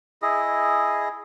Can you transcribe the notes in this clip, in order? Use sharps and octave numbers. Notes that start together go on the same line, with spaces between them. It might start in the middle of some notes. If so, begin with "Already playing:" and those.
E4 G#4 D#5